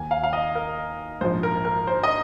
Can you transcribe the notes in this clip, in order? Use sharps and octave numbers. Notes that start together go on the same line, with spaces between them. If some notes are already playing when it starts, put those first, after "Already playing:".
Already playing: D#2 D#3 A#3 G#5
F5
F5
D#5
A#4
A#1 G#2 F3 C5
A#4
A#4
C5
D#5